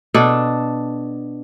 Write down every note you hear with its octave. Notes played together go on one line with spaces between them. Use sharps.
B2 D4 A4